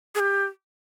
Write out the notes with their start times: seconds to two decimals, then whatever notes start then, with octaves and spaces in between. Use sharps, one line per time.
0.15 G#4
0.20 G4